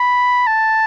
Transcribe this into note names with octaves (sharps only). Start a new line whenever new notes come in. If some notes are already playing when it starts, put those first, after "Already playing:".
Already playing: B5
A5